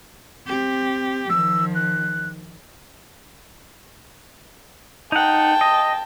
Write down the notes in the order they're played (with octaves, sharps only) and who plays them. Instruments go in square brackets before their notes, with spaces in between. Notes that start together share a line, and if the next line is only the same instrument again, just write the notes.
[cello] C4 G4
[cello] D#3 F3 [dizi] E6
[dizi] F#6
[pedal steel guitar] D#4 F#5 [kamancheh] G5 A5
[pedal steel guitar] D#5